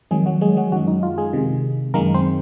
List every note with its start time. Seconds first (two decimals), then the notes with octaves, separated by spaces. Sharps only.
0.11 F2 D#3 F#3 G#3 G#4
0.26 F#3 F#4
0.41 G#3 G#4
0.57 F#3 F#4
0.72 F#2 D#3 F#3 G#3 F#4
0.87 D#4
1.03 F4
1.18 G#3 G#4
1.33 C3 D#3 G#3
1.94 F#2 D#3 G#3 A#3 A#4
2.14 C4 C5